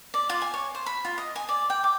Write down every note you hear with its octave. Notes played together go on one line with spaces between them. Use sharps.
D5
F4
G#5
C#5
C5
B5
F4
D#5
G#5
D5
G5
D6